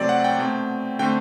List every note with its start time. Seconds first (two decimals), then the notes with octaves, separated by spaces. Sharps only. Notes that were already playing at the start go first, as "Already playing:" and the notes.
Already playing: C3 F#3 A3 C4 D5
0.09 F#5
0.24 G5
0.38 B2 A3 C4
0.99 D3 A3 C4 G5